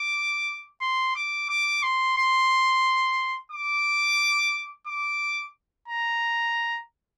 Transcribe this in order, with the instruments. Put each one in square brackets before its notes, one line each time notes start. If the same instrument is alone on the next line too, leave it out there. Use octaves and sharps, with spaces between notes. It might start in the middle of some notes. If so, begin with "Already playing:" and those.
Already playing: [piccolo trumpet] D6
C6
D6
D6
C6
C6
D6
D6
A#5